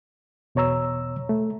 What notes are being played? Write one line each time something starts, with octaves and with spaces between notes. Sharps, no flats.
E2 B2 C#5 A#5 E6
A3